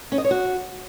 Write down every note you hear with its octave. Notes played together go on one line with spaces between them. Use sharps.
C#4
D#5
C#5
F#4